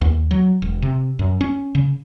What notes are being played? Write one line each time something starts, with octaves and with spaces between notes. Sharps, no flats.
D#2
F#3
E1
C3
F#2
C#4
C#3